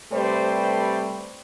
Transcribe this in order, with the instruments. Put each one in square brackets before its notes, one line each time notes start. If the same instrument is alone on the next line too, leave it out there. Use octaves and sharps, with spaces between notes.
[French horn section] C3 G3 A3 B4 C5 D5